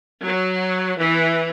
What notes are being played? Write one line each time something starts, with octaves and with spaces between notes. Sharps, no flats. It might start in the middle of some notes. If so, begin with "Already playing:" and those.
F#3
E3